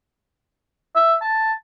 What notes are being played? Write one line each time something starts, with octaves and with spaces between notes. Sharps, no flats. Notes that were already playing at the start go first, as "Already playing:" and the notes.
E5
A5